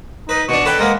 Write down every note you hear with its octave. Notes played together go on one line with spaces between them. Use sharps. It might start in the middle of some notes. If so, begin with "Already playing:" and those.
D#4 B4
B2 D4 C#6
A4 B4 C#5 G5
G#3 A#3 B3 A#4